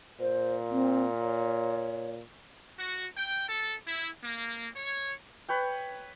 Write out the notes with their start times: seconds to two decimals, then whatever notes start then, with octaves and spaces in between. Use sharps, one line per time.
0.20 A#2 C5
0.70 C4
1.20 C#5
2.78 F#4
3.17 G5
3.48 A4
3.86 E4
4.23 A#3
4.77 C#5
5.49 B4 C#5 G5